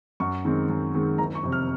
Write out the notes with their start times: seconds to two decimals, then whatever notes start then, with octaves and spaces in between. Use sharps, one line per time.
0.20 F#2 C#6
0.45 D#3 G#3 C4
0.70 F#2
0.94 D#3 G#3 C4
1.18 F#1 A#5
1.35 C#6
1.43 F2 C3
1.52 F6